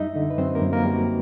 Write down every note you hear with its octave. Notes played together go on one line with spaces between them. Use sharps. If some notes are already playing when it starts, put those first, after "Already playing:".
Already playing: F#2 G3 D#4 D#5 E5
D3
B4
F#2 C4 C5
A#3 A#4
F#2
A#3 A#4
G3
F#4